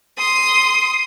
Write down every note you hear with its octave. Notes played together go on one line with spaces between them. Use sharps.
C6 D#6